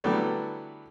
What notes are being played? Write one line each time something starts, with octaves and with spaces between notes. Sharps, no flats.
D3 E3 F#3 G3 A3 B3